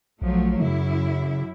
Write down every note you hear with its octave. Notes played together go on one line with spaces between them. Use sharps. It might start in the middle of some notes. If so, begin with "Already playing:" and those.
A#1 F3 F#3 A3
F#2 C#3 E4